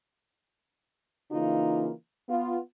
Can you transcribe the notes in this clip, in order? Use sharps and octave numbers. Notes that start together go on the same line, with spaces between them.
C#3 E3 A#3 D#4 F4
B3 F4